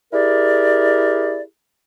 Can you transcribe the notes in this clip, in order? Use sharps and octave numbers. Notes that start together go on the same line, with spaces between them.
E4 G4 G#4 A#4 D5